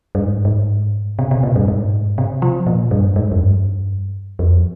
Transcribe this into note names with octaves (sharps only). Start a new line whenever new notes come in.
G2
G#2
G#2
C3
C3
A#2
G2
G#2
C3
F3
A#2
G2
G#2
G2
F2
G2
F2